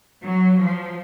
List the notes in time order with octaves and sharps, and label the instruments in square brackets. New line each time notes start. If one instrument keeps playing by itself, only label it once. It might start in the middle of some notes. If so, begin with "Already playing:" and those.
[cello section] F#3
F3